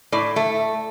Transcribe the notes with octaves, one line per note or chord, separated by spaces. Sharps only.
A2 D5
A3